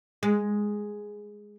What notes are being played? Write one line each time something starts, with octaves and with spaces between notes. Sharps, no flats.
G#3